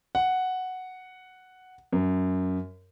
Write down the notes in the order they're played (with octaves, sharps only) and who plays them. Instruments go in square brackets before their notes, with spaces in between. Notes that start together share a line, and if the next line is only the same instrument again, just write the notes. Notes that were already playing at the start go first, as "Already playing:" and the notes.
[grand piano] F#5
F#2